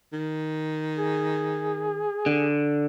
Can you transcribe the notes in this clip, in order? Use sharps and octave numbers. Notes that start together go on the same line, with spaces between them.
D#3
G#4
D3